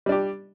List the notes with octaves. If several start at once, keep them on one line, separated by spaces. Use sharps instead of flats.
G3 D4 G4